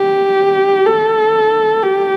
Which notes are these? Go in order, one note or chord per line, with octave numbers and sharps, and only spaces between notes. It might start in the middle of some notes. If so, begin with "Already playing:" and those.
Already playing: G4
A4
G4